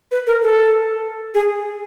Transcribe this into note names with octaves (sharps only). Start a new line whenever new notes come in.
B4
A#4
A4
G#4